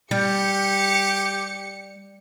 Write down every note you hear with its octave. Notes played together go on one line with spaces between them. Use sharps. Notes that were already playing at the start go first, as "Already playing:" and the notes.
G3 G4 C#7